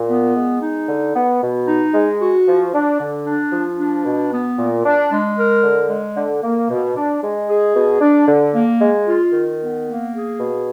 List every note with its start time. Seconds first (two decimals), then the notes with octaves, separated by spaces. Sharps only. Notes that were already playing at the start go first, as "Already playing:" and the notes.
Already playing: A#2
0.09 B3
0.35 G#3
0.62 D#4
0.88 D3
1.15 B3
1.41 B2
1.68 D#4
1.94 G#3
2.20 F#4
2.47 F3
2.74 D4
3.00 D3
3.26 D4
3.52 F3
3.79 D4
4.05 B2
4.31 B3
4.58 A#2
4.85 D4
5.11 G#3
5.37 A#4
5.63 D3
5.90 G#3
6.16 D3
6.43 A#3
6.70 B2
6.96 D4
7.22 G#3
7.48 G#4
7.75 B2
8.01 D4
8.27 D3
8.54 A#3
8.80 G#3
9.07 F4
9.33 D#3
9.60 B3
9.86 A#3
10.13 G#4
10.39 B2